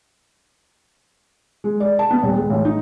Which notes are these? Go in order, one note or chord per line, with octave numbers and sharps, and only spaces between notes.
G#3
D5
A5
B3
D#1
G#3
A1
D#4